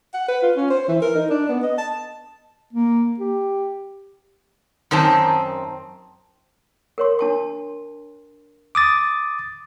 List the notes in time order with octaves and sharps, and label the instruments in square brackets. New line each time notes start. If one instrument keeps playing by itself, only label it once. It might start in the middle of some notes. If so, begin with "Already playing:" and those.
[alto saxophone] F#5
B4
F4
C#4
C5
E3
A#4
D#4
D4
B3
D#5
A5
[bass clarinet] A#3
G4
[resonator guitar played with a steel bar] F#2 D#3 C4 A5
[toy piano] A#4 C#5 C6
D4 A5 C6
[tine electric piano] D6 D#6 A6